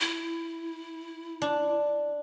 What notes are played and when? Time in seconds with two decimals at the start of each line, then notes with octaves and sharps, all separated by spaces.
0.01 E4
1.42 D4